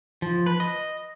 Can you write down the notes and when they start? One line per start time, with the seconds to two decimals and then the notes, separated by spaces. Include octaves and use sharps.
0.22 F3
0.46 B4
0.60 D#5